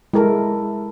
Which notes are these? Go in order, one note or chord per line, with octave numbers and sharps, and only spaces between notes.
G#3 E4 A4 A#4